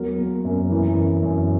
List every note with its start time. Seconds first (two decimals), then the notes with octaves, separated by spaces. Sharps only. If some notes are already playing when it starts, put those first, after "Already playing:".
Already playing: E2 F#3 G#3 A#4
0.18 A#3
0.45 F#2
0.70 E3
0.96 F#2
1.23 F#2